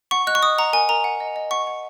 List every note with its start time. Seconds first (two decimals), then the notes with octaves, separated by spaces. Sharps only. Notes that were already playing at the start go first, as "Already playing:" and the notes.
0.11 F#5 C#6
0.27 D#5 F#6
0.35 C#6
0.42 D#5 D#6
0.58 F#5 A#5
0.73 A#4 G#5
0.89 A#4 A#5
1.04 F#5
1.20 D#5
1.36 D#5
1.51 F#5 C#6
1.67 F#5